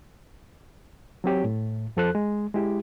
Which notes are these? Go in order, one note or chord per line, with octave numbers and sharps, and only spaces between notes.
F#3 C4 G4 C#5
A2
F2 F3 A4 C5 F#6
G#3
G#3 E4 G4